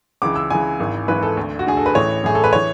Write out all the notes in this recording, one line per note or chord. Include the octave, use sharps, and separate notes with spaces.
C#2 C#3 E3 D6
E6
C#2 C#3 E3 G#5
G#1 G#2 E3
G#1 G#2 E3 B4
A4
D2 D3
F#4
D2 D3 G#4
A4
B4
A1 A2 E3 C#5
A1 A2 E3 G#4
A4
B4
E3 C#5